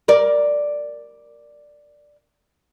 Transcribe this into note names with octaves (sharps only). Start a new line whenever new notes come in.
A#4 D5